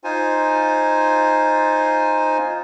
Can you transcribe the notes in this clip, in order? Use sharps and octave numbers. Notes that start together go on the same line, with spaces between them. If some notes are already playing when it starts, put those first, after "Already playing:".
D#4 F4 C5 G#5